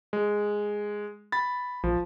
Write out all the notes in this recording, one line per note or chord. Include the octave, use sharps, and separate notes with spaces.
G#3
B5 A6
A#1 F3